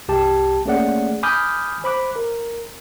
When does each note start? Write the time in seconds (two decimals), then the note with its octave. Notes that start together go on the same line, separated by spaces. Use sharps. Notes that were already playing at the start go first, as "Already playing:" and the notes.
0.08 C2 G4 A5
0.66 A3 A#3 C#4 G#4 D5 F#5
1.23 G#5 B5 D6 D#6 F6 G6
1.84 C5 B5 D6 F#6
2.16 A#4